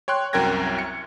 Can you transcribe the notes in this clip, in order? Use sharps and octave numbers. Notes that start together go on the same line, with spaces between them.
C#5 G5 C6 F#6
C2 F#2 A#4 G5 G#6 A#6
C#7